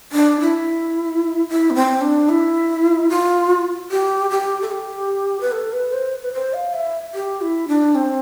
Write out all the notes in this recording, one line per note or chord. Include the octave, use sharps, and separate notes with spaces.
D4
E4
E4
B3
C4
D4
E4
F4
G4
G4
A4
G4
B4
A4
B4
C5
B4
C5
F5
E5
G4
E4
D4
C4